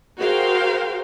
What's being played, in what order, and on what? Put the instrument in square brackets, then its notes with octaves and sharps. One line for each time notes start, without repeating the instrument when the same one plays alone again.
[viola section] F#4 G#4 A#4 C5 F5 G5